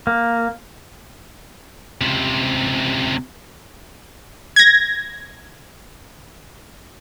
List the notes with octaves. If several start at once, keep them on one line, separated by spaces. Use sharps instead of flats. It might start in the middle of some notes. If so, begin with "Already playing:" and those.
A#3
C#2 C3
G#6 A#6